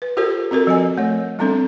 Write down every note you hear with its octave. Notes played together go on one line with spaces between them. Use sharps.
B4
F4 G4 A4 A#4 C5
C4 F#4 A4 A#4
F3 D#5 G#5
A3 C#5
G3 B3 C4 D4 A4